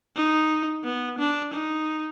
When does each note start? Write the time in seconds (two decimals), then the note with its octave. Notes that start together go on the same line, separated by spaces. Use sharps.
0.16 D#4
0.85 B3
1.18 D4
1.54 D#4